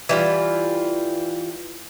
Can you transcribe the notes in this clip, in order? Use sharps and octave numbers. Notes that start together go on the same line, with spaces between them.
E3 G3 F4